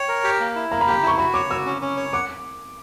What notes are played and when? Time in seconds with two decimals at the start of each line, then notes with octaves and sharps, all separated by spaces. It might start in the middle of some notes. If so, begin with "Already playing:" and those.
Already playing: C#5 G5
0.08 A#4
0.24 G4
0.40 A#3
0.55 E4
0.71 A#3 A#5
0.81 B5
0.87 G4 A#5
1.03 E4 C#6
1.18 F#4 B5
1.34 C#5 D6
1.50 F#4 E6
1.66 C#4
1.82 C#4
1.97 C#5
2.13 F#5 D6